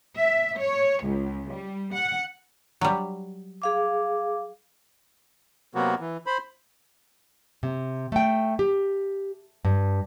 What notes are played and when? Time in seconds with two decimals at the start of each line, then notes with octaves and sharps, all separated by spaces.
0.18 E5
0.59 C#5
1.05 C#2
1.51 G3
1.94 F#5
2.81 F#3 G3
3.62 G#4 F5 D6
5.75 C3 F#3 A#3 B3 F#4
6.00 E3
6.27 C5 B5
7.63 C3
8.12 A3 G5
8.59 G4
9.65 G2